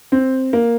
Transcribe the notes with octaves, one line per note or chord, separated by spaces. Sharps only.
C4
A#3